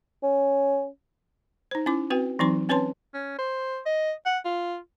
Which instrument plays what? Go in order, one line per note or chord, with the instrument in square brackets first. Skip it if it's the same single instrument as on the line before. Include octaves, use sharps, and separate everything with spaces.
[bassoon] C#4
[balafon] D#4 C5
C#4 E4 D6
C4 F#4 B4 G5
E3 F#3 C4 D#4 C6
C4 C#4 B4 C#5 A5 C6
[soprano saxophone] C#4
C5
D#5
F#5
F4